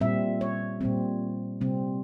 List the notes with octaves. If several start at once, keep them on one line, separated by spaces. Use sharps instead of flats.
A#2 G3 C4 E5
C#5
A#2 G3 C4
C3 G3 C4